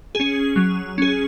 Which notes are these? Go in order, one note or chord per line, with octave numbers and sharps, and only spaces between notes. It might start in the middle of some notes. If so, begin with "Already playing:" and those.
C#4 G#4
F#3
C#4 G#4